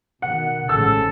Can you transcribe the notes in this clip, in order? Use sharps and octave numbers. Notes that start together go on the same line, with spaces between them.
B2 D#3 F#5
A1 G#2 C#3 A4 E6